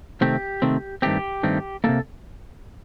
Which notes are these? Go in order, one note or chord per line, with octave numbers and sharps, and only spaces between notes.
C3 D#3 A3 C4 G4
C3 D#3 A3 C4
G2 D#3 A3 C4 G4
G2 D#3 A3 C4
C3 D#3 A#3 A4